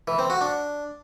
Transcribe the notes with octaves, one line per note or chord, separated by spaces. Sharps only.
E3
C4
F#4
D4